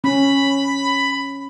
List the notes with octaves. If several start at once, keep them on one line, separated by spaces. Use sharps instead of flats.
C#4 B5